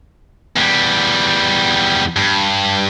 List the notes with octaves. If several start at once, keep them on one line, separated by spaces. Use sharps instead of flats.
E2 G3
G2